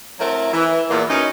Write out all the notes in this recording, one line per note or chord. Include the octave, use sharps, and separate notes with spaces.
F#3 A3 C4 E4 A#4
E3
E2 A#2
F#2 C#4 D#4